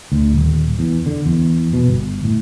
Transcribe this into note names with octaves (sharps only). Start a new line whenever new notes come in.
D2
D#1
E2
D3
E2
B2
G1
A2